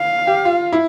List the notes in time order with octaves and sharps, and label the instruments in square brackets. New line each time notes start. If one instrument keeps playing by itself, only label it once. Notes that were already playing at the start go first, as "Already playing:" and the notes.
Already playing: [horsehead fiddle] F5
[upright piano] G4
F4
E4